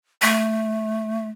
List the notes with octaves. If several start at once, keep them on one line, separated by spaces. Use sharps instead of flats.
A3